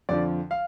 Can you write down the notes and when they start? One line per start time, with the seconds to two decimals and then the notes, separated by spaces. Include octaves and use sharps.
0.09 F2 D3 F3 D5
0.51 F5